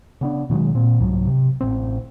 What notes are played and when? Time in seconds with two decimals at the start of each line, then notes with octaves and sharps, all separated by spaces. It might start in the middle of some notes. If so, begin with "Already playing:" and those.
0.21 C#3 B3 D4
0.50 B2 D#3 F#3 G#3
0.75 A#2 C4
1.00 C2 G#2 F#3
1.27 C3
1.61 A1 C4